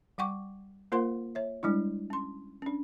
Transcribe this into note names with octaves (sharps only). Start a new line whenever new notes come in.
G3 F#5 G5 C#6 D6
A#3 F4 A#4 C5 F#5 C6
C#5 E5
G3 G#3 D4 E4
C#4 C6
C#4 D4